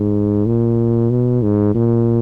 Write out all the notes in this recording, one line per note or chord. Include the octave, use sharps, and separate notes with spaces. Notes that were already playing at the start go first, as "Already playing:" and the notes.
Already playing: G#2
A#2
B2
G#2
A#2